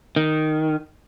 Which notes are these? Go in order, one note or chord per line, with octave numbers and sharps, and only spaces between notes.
D#3